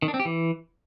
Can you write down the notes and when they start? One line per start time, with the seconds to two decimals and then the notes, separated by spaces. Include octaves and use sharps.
0.02 D#3
0.08 D4
0.14 C4
0.20 G4
0.25 E3